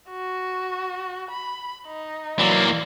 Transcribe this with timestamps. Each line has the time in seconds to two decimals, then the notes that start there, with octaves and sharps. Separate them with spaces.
0.10 F#4
1.31 B5
1.88 D#4
2.39 E3 F#3 A#3 D5 C6